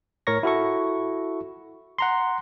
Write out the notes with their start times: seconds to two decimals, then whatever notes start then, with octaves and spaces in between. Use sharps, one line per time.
0.27 A2 A#4 C#5 C#6 A#6
0.43 E4 F#4 A4 C#6
1.98 F#5 A#5 C6